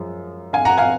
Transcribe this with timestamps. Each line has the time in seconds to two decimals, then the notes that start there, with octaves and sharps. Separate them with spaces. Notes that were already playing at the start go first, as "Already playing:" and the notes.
Already playing: F#2 F3 G#3
0.53 F5 G#5
0.65 F#5 A#5
0.78 F5 G#5